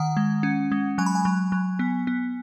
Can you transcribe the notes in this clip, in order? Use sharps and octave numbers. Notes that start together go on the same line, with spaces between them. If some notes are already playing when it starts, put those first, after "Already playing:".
Already playing: D#3 F#5
G#3
C#4
G#3
F#3 G#5
B5
G#5
F#3
F#3
B3
B3